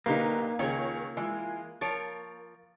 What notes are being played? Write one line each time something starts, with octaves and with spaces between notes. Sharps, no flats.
B1 D3 A#3 D#4 G4 B4 A#5
C#2 D#3 C#4 G#4 C#5
E3 G#3 F4
F3 A#4 C#5 A6 D7